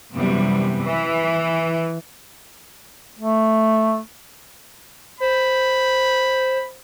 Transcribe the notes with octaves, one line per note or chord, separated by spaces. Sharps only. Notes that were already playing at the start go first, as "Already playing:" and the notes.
F#2 C3 E3 G3 B3
E3
A3
C5 B5